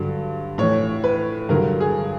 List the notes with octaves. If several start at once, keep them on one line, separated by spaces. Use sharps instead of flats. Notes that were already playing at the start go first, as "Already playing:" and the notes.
Already playing: G2 D3 F#3
A2 E3 C#5
B4
G2 D3 F#3 A#4
G#4